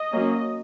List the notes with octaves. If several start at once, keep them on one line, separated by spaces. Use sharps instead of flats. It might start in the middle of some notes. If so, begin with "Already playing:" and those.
Already playing: D#5
F#3 A#3 C#4